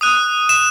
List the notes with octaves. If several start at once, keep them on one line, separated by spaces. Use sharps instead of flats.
D#6 F#6 D#7
E7